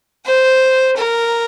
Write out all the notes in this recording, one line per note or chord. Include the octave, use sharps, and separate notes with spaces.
C5
A#4